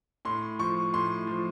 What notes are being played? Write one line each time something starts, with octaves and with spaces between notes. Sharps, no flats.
A2 C6
F3 C#6
A2 C6
F3